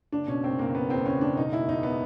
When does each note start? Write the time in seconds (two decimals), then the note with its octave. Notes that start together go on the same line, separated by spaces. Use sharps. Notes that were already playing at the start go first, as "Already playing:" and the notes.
0.12 F#1 D4
0.27 B2 C#4
0.43 F#1 C4
0.59 F#1 A#3
0.75 F#1 B3
0.90 E2 C4
1.05 F#1 C#4
1.21 F#1 D4
1.37 E1 D#4
1.53 E1 E4
1.68 E2 D#4
1.83 B3